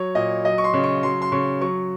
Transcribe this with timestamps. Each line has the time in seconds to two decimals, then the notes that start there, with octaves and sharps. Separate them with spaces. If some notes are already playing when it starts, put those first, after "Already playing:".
Already playing: F#3 C#5
0.15 A#2 D#5
0.44 F#3 D#5
0.58 C#6
0.64 C6
0.73 C#3
0.84 C#6
1.03 F#3 C6
1.22 C6
1.32 C#3 C#6
1.61 F#3 C#6